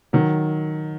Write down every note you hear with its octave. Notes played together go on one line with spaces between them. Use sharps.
D#3 F#3